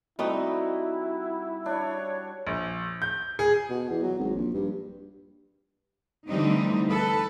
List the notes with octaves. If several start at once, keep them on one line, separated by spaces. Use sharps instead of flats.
G3 A3 C4 D#4 E4 F#4
D4 C#5
A#1
G6
G#4
B2
E2
F#3
G#1
A#1
G2
D3 E3 G3 A3 C4 D#4
A4 B4